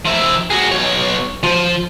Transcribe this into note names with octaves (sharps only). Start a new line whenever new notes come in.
F3 E5
F#4 G#4
B1 C#5
F3